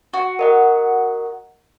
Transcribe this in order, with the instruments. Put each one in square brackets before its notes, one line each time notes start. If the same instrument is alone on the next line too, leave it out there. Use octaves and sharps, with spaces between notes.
[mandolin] F#4
[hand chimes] A#4 D#5 F#5